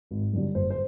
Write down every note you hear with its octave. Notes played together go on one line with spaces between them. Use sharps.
G#1
F#2 D3 G3
F#1 C5
C5